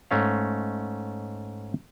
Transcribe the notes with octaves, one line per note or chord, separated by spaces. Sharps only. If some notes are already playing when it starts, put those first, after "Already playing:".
G#2 A3 C#4 F5